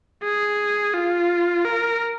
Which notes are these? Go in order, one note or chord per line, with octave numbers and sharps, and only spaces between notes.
G#4
F4
A#4